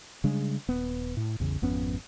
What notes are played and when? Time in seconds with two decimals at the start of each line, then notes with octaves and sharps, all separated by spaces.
0.24 C#3 G3 G#3 D4
0.68 D#1 B3
1.17 A2
1.40 A1 E2 C#3
1.62 G#1 F2 B3 C#4